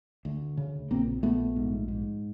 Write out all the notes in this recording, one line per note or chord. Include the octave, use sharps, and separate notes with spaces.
D2
C#3
A#1 A#3 C4
A#1 A3 B3
G#2
G#2